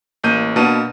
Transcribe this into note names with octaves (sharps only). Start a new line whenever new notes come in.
A1 A#3 G6 D#7
B2 A#3 D4 A5 D#7